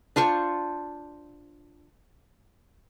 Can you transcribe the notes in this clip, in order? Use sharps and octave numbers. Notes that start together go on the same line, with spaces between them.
D4 F4 C5 C#6